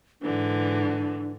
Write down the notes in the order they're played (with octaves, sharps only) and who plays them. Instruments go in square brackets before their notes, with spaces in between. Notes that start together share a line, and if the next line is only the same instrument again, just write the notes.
[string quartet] G#2 D3 E3 [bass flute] D4